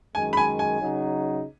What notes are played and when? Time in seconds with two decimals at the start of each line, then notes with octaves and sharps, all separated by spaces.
0.15 F#2 D#3 G#3 G#5
0.33 B5
0.37 G#5
0.59 G#5
0.81 C#3 F#3 D#4